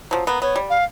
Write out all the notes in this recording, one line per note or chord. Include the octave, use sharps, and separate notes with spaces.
F3 F#3
A#3 B3 A#5
B3 C#5
G3
F5